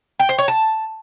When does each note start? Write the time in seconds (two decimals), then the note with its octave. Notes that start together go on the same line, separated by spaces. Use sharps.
0.19 G5
0.29 C5
0.38 C#5
0.48 A5